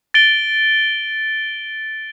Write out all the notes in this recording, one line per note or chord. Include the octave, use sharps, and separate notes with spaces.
A6 D7 G7